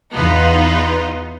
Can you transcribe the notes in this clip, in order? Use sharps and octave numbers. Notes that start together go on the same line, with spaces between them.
E2 B3 D#4 F4